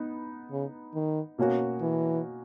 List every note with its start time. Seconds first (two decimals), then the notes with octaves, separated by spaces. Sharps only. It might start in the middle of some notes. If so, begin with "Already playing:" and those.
Already playing: B3 D#4
0.51 C#3
0.94 D#3
1.38 B2 A#3 C#4 F#4
1.81 E3